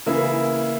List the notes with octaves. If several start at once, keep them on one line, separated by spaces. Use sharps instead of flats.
C#3 E3 A#3 E4